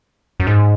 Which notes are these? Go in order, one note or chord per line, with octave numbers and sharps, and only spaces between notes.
F#2
G#2